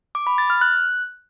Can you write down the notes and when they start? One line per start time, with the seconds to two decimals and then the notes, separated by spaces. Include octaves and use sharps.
0.15 D6
0.27 B5
0.38 A6
0.50 F6
0.61 F#6